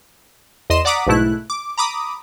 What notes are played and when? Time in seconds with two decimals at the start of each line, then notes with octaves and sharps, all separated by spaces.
0.70 E2 D#5 C6 E7
0.85 D5 F#5 A#5 D6 D#6 B6
1.07 B1 G#2 B2 A3 E4 F#6
1.50 D6
1.78 A#5 B5 D6 D#6